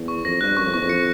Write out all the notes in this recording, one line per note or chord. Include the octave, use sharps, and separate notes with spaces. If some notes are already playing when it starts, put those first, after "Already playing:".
Already playing: E2
C#6
F2 A#6
G2 F#6
F#2 C#6
F2
E2 C#6
F2
C#7